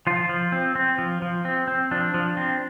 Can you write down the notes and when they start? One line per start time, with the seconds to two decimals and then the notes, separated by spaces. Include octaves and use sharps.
0.07 F3 F4
0.29 F3
0.52 C4
0.75 C4
0.98 F3
1.22 F3
1.45 C4
1.68 C4
1.91 F3 D4
2.14 F3
2.37 C4